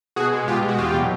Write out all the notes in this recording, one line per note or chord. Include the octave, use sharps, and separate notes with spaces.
B2 F#4 G#4
G#3
B2 F4 G4
G#3
F#4
E2 F4 G4
B2 F#3